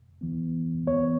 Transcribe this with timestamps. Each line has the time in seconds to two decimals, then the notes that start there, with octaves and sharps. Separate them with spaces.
0.21 E3 B3
0.87 E3 B3 C#5